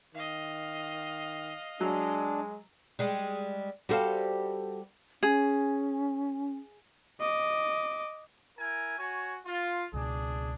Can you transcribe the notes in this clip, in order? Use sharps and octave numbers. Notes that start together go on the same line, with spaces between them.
D#3 D#5 F5
F#3 G#3 D4
G3 G#3
G3 F#4 G4 A4 C5 F5
C#4 G#4
D#5 D6
E4 A#4 G#5
F#4 C#5 G#5
F4
C#2 B2 D4 G#4